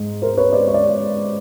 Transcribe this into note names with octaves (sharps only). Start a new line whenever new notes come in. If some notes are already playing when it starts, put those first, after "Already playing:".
Already playing: G#2
A#4 C5
B4 C#5
C5 D5
C#5
D5